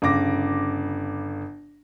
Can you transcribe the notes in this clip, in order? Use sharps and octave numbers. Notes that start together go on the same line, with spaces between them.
G1 C#3 D6 A#6